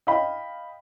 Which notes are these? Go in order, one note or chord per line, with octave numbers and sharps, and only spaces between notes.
D#5 F5 G5 B5